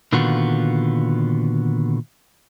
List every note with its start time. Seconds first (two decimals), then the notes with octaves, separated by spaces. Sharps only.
0.12 A#2 D3 D#3 B3 F4 F#4